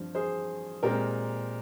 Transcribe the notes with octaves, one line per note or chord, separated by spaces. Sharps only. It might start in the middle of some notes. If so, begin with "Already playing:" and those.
Already playing: G2 F3 C4
G#4 C5
A#2 G#3 C4 G4 A#4